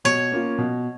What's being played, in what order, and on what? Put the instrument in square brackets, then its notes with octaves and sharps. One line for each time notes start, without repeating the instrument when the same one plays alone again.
[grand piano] B2 [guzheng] C#5
[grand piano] A#3 C#4 F4
B2